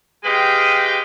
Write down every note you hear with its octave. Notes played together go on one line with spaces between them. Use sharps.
G#3 G4 B4 D#5 F5 G5